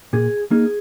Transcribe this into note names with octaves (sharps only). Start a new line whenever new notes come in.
A#2 G#4
A#3 D#4 G#4